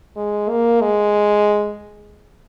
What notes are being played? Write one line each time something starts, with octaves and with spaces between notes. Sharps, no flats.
G#3
A#3
G#3